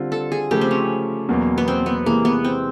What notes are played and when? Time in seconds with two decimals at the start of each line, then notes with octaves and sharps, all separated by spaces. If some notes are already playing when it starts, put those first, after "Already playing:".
Already playing: D3 G3 C4 F4
0.12 A4
0.32 G#4
0.51 C#3 F3 A3 G4
0.61 C4
0.71 C#4
1.29 E2 B2 F#3 A#3
1.58 B3
1.68 C4
1.86 B3
2.06 C3 E3 G#3 A#3
2.25 B3
2.45 C4